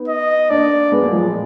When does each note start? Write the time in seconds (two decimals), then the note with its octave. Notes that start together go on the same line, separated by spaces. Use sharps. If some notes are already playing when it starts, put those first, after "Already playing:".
Already playing: B3 D#4
0.08 D#5
0.50 A#3 D4 D5
0.92 G#3 B3
1.02 F#3 A#3
1.12 F3 G#3
1.22 A#2